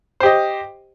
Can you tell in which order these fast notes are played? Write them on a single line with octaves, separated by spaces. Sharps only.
C5 G4 D#5